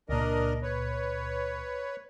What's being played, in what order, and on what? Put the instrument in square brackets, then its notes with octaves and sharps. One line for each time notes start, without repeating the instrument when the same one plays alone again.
[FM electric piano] C#2 A#2 [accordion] D4 A#4 D#5
[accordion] B4 C#5